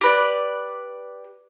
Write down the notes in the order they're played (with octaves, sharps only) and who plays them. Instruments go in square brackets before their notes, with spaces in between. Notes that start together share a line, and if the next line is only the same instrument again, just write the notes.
[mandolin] G4 B4 D5